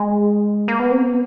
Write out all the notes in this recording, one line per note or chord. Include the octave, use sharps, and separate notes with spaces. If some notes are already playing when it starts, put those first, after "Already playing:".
Already playing: G#3
A#3
B3
C4
B3